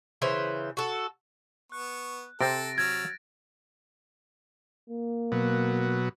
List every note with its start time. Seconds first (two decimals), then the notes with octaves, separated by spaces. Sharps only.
0.22 C#3 E3 C5
0.77 F#4 A4
1.72 B3 C#6 F#6
2.41 C3 C4 A4 A6 A#6 D7
2.78 F#3 E6 F6 G#6
4.90 A#3
5.32 B2 F#3